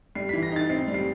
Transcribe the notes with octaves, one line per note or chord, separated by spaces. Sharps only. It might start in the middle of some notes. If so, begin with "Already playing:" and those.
G3 C7
E3 B6
A#6
D#4 A6
C4 C7
G3
C7